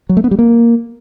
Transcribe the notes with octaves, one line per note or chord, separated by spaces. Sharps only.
F#3
A3
B3
G3
A#3